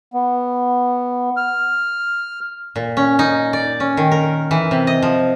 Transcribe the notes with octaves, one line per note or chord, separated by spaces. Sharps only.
B3
F6
A#2
C#4
D#4
D5
C#4
D#3
A#4
E3
C3
D#5
F3